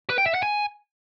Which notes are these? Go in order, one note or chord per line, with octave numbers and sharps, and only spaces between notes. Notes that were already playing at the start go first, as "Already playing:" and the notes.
B4
G5
E5
F#5
G#5